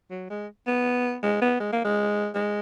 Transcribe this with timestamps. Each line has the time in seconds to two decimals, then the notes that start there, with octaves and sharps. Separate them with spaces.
0.11 F#3
0.30 G#3
0.67 B3
1.23 G#3
1.42 B3
1.60 G#3
1.73 A#3
1.85 G#3
2.35 G#3